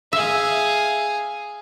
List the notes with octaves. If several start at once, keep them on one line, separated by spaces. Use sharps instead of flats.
G#4 E5 F5